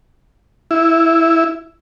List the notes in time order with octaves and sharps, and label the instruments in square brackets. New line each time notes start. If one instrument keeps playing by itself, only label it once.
[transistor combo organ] E4